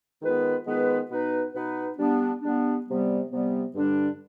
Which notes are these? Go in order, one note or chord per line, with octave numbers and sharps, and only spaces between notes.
D#3 G#3 B3 F4 B4
D#3 G#3 B3 F4 B4
B2 B3 D#4 B4
B2 B3 D#4 B4
G3 B3 D4
G3 B3 D4
C3 G3 B3
C3 G3 B3
G2 D3 G3 D4